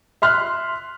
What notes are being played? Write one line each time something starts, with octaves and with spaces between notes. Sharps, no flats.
E5 C6 F6 F#6